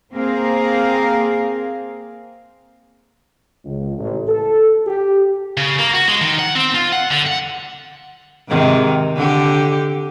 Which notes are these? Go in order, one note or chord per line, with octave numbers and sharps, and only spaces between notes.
A#3 C4 G#4 A#4 F5
C#2
A1
A4
G4
C#3
A#3
F#4
G#3
D#3
F#5
C4
F4
F#5
D3
F#5
G#2 C3 D#3
D3 G4